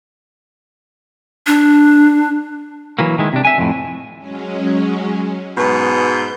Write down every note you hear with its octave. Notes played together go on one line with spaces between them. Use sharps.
D4
E3 F#3 A#3
D#3 G#3 E4
C3 D4
E5 G#5
F2 A2
F#3 G#3 C#4
G#2 B2 B4 G6